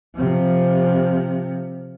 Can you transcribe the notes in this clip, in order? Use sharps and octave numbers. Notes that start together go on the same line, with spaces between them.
C3 F3